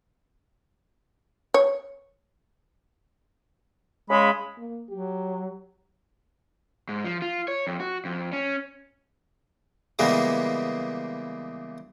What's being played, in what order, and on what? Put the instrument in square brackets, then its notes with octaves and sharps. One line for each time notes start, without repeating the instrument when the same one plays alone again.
[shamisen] C#5
[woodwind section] C#3 B5 [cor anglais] G#3
[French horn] A#3
[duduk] F#3 [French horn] G4
[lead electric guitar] G#2
F3
F4
C#5
F2
F#4
F2
C#4
[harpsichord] C#3 E3 G3 G#3 A#3 B3